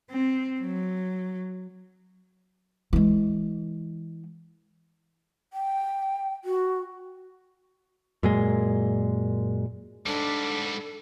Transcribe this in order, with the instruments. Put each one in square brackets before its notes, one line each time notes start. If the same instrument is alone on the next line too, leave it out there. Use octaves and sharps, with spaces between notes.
[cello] C4
F#3
[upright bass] E3 G#3
[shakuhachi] G5
F#4
[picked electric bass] F#2 A#2 G#3
[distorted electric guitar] G#2 G3 [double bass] D4 [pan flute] A4